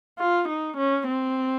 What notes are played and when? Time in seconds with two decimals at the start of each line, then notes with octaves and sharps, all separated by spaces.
0.19 F4
0.49 D#4
0.77 C#4
1.08 C4